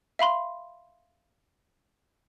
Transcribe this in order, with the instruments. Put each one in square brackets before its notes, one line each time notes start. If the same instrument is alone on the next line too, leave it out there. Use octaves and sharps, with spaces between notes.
[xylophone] E5 F5 B5 C6